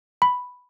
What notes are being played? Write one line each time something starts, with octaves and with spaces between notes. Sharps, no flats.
B5